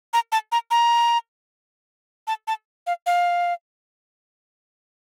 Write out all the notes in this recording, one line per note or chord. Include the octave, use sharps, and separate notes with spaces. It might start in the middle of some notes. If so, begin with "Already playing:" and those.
A#5
A5
A#5
A#5
A5
A5
F5
F5